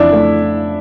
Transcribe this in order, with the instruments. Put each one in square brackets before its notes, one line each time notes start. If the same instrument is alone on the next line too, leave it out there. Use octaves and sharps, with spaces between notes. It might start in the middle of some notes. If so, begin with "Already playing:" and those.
Already playing: [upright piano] F2 C#3 E3 [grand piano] D4 E4
[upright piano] A3